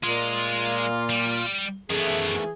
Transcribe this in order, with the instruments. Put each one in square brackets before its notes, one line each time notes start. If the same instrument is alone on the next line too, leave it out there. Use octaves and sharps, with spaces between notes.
[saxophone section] A#2 [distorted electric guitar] G#3 [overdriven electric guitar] F4
[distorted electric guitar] G3
[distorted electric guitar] F#2 B3 [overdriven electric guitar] D#3 A3 [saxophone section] E3 G#4